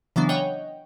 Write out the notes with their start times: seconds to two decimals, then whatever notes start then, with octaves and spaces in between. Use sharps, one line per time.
0.16 C#3 E3 F#3 B3 D4
0.29 C#5 D#5 F#5 G5